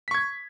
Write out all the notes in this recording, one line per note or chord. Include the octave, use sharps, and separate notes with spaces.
C#6 G#6 B6